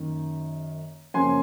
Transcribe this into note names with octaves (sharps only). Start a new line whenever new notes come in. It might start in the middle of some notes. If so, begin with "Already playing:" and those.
Already playing: F#2 D#3 A#3
F#2 C#3 F3 A#3 C#4 G#5 C6